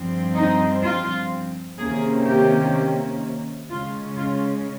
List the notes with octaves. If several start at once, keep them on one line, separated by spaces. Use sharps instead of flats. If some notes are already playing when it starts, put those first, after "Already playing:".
Already playing: G2 F3 C4
D#4
F4
C3 D#3 A#3 C#4 G#4
G4
C#3 G#3 C#4 F4
F4